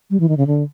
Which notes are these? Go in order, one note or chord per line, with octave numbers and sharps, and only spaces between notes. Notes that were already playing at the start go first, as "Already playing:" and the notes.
G3
E3
D#3
C#3
D3